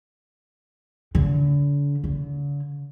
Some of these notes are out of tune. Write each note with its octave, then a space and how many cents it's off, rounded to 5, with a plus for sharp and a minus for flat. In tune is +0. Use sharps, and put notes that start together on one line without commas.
D3 -40
D3 -45